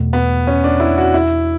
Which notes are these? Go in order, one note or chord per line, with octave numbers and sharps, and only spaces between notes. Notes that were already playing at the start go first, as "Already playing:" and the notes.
Already playing: E2 B2 A3
B3
C#4
D4
E4
F#4
E4